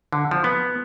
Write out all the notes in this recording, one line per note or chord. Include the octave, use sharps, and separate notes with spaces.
D3
F3
B3